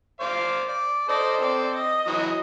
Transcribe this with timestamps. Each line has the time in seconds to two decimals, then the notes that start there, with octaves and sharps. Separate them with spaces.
0.20 C5 D5 F5
0.69 D5
1.09 A4 C5 D5 D#5
1.41 C4 D5
1.76 D#5
2.07 E3 F#3 D#6